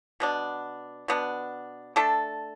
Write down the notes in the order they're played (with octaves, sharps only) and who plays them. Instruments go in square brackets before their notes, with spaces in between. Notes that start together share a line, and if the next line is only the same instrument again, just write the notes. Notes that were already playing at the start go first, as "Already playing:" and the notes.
[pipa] B2 B3 D4
B2 B3 D4
A3 D4 A4